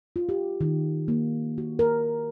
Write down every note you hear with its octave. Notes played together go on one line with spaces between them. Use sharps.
F4
G4
D#3
A#3
F#4
A#4